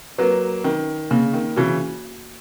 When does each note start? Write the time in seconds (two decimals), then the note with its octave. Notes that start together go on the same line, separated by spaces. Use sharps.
0.18 F#3 A#3 B4
0.64 D#3 C#4
1.11 C#3 A#3
1.33 D#3
1.56 C#3 E3 F#4